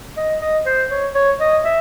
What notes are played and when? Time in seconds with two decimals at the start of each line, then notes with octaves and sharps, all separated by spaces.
0.17 D#5
0.41 D#5
0.66 C5
0.91 C#5
1.15 C#5
1.40 D#5
1.64 E5